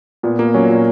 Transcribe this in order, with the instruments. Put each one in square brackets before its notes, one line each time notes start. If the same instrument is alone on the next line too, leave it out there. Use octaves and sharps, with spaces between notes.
[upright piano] A#2 [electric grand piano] B3
[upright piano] A#2 [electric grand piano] A#3
[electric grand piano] F#3 [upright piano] C#4
[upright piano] A#2